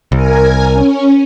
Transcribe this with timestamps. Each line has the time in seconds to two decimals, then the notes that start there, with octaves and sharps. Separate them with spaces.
0.12 C2 A#4 G#5
0.74 C#4